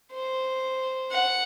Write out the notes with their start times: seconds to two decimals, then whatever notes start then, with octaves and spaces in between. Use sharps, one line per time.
0.13 C5
1.12 F#5